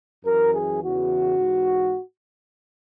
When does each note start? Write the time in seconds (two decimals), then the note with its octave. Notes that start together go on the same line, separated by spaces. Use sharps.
0.25 F#2 E3 A#4
0.54 G#4
0.82 E2 C#3 E3 F#4
1.39 G#2 E3